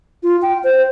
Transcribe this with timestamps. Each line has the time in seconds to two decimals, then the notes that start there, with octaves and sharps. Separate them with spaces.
0.23 F4
0.42 G5
0.64 C5